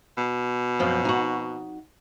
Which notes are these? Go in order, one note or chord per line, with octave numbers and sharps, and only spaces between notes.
B2
F#2 F3 C4
D#4 F#4